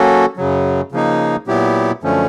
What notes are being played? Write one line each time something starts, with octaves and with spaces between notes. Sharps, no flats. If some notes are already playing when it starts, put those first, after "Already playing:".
Already playing: F#3 A#3 C#4 F#4 A4
F#2 C#3 F#3
C#3 F3 A#3 D#4
A#2 F#3 B3 E4 G4
F#2 D3 F3 A3 C#4